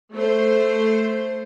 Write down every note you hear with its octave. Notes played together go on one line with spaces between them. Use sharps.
A3 C5